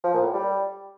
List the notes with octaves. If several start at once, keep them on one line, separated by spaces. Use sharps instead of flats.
F3
A#2
A2
G3